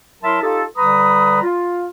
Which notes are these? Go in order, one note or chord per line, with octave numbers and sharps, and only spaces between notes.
F#3 E4 A#4 E5 A5 C6
D#4 F4 G4 A4
D3 G3 B4 A#5 B5 D#6
F4